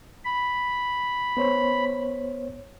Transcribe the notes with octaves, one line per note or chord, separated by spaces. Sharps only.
B5
B3 C5 C#5